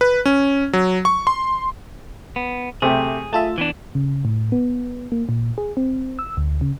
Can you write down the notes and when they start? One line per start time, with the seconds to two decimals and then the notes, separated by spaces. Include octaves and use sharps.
0.01 B4
0.26 C#4
0.73 F#3
1.05 C#6
1.27 C6
2.36 B3
2.82 C3 A3 G4 G#4
3.33 A3 F4 E5 A5
3.58 E3 B3 D4
3.95 C#3
4.25 A2
4.52 B3
5.12 A#3
5.29 A#2
5.58 G#4
5.77 C4
6.19 E6
6.37 D2
6.61 C#3